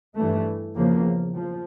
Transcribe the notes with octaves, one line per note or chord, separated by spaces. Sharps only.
G2 E3 A3
E2 C#3 F3 A#3
F3